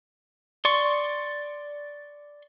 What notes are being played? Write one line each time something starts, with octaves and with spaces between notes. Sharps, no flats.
D5 C6 C#6